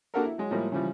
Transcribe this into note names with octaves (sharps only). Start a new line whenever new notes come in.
A#3 D4 F#4 G4 A4 A#4
E4
F#3 G#3
A2 F3 G3 G#3 A#3
C#3 E3 F3 G3